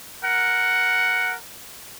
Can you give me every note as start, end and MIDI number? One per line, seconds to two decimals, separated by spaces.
0.23 1.36 70
0.23 1.36 78